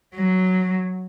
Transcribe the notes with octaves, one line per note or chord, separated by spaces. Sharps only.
F#3